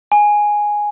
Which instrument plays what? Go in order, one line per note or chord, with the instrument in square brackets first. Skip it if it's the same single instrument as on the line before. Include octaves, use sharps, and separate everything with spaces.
[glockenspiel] G#5